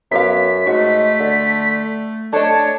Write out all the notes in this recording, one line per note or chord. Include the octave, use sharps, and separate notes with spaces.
F#2 B3 G4 F5 B6
G#2 A3 F#4
D3
A3 D4 C#5 D#5 A5